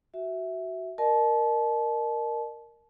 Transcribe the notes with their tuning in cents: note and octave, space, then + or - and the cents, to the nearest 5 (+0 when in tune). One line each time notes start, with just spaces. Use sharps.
F#4 +10 E5 -5
A#4 +0 D#5 -40 A5 -30